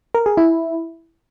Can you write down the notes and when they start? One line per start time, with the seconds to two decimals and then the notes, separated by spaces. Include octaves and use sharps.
0.15 A#4
0.26 G#4
0.37 E4